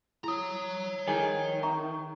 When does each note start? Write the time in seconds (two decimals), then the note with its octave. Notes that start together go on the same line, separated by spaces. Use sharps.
0.24 E4 C#5 A#5 D#6
1.08 D#3 E4 G#4
1.63 E5 A#5 C#6